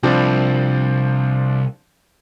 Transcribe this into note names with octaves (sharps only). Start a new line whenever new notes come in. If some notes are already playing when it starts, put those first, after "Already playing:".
C2 F3 C4 D4